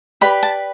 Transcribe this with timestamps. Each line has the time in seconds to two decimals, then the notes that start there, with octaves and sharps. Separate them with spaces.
0.21 G4 B4 D5 B5
0.43 A5